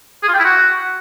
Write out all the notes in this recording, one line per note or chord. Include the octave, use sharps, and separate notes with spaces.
G#4
F4
G5
E4
F#4